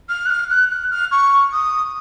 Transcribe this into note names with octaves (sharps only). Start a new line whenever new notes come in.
F6
F#6
F6
F#6
F#6
F6
C#6
D#6